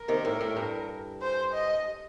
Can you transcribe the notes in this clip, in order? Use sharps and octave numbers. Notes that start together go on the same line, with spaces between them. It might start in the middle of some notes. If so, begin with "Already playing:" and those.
Already playing: A#4
C3 D#3
A2
A2
G2
C5
D#5